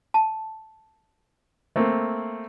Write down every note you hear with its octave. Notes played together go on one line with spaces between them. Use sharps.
A5
A3 A#3 C4